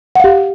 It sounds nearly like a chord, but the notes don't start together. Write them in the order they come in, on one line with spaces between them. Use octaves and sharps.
F#5 F5 G4